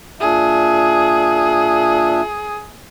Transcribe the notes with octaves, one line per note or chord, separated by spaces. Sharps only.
A#2 D4 G#4 E5